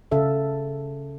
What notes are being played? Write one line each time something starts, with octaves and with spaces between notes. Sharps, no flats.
C#3 A4 E5 F5